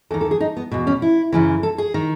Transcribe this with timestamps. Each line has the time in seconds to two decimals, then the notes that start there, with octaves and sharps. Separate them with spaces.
0.11 E2 A4
0.14 D#3
0.21 A4
0.31 G#4
0.41 D#4
0.57 B3
0.71 E2 B2
0.87 C#4
1.02 E4
1.33 F#2 C#3 E3
1.63 A4
1.78 G#4
1.94 D#3